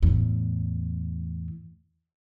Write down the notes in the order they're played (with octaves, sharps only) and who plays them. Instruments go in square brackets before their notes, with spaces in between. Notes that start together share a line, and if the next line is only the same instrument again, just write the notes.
[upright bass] E2 A2